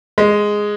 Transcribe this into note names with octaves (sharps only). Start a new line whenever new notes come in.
G#3